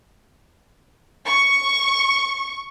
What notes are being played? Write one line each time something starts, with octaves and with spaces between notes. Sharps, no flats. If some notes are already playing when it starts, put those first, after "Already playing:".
C#6